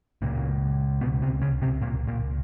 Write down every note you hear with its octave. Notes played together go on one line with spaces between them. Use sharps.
C#2 A#2 C#3 A#3
B2 B3
C3 C4
C#3 C#4
C3 C4
A#2 A#3
A#2 A#3